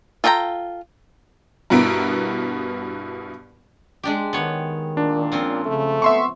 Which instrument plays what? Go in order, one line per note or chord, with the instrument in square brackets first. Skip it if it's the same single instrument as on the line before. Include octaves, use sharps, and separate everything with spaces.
[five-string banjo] F4 A4 E5 G5 A#5
[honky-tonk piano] G2 B2 B3 E4 A#4 D7
[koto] G#3 D4 G4
[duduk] D#3 [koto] B3 C#5
[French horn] A#2 [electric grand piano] D4
[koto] F3 C4 C#4
[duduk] C#3 [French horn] A3
[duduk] B3 [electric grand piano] E5 C6 C#6